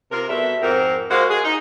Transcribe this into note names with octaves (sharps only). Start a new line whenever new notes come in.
C3 F4 A#4
B2 G3 A4 E5
F2 G#2 C4 A#4
G#3 A#3 F#4 C5 F5
G#4
D#4